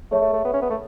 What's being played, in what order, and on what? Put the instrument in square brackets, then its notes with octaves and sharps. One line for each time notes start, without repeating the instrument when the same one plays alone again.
[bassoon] A3 [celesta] G#4 C#5 E5 A5 C#6
[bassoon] A3
A3
B3
C#4
B3
A3